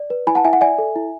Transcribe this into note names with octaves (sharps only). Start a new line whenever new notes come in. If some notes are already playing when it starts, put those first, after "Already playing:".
Already playing: D5
B4
E4 G#5 B5
F#5 A5
E4 E5 G#5
F#5
D5 E5 G#5
A4
E4